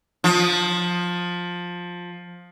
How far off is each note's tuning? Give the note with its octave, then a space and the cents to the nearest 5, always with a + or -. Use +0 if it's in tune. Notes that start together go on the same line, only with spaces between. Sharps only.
F3 +15